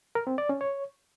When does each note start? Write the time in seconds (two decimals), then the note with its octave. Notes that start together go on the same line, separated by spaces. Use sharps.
0.15 A#4
0.27 C4
0.38 D5
0.49 C#4
0.61 C#5